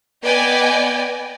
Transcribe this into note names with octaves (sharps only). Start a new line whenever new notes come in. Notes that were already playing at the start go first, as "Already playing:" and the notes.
B3 D5 D#5 G5 G#5